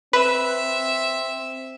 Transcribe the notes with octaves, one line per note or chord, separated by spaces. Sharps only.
C4 B4 E5